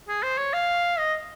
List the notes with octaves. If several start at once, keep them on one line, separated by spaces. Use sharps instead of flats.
G#4
C5
C#5
F5
D#5